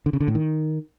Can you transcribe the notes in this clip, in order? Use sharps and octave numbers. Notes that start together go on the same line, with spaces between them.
D3
C#3
D3
A2
D#3